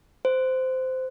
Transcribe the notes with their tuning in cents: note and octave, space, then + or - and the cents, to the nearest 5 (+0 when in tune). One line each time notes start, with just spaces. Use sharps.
C5 -15